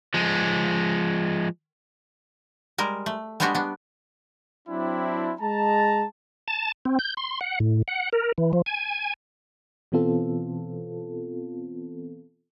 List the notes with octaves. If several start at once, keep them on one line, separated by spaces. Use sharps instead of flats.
F3 G#3
G3 G#3 A#4
A3
G3 G#3 B3 D4 F#4 G4
B3 D4
F#3 C4 D4 E4
G#3 A5 A#5
A5
C4
G6
C6
F#5
A2
F#5
A#4
E3
F3
G#5
B2 E3 B3 C4 F4 A4